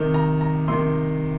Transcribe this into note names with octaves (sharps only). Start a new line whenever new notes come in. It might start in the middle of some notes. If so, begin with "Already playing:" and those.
Already playing: C3 D#3
A#5
A#5
C3 D#3 C6